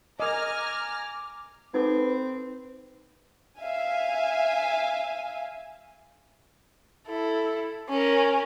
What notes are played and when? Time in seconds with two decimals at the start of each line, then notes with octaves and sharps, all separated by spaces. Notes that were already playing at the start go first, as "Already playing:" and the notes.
0.20 A#4 D#5 G#5 A#5 D6 F6
1.74 C4 D#4 A4 B4 D6
3.59 E5 F5 G#5
7.07 E4 A4
7.89 C#4 A#4